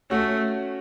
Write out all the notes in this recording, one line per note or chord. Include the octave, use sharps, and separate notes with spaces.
A3 C#4 F#4